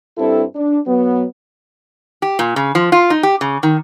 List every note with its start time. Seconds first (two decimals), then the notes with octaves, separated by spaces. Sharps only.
0.17 G2 C4 E4 A4
0.55 D4
0.85 F#3 B3
2.22 G4
2.39 A#2
2.56 C#3
2.75 F3
2.92 F4
3.10 D#4
3.23 G4
3.41 C#3
3.63 D#3